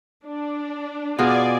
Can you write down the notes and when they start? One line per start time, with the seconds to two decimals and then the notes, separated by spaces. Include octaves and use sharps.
0.25 D4
1.19 B2 F4 G#4 D5 G#5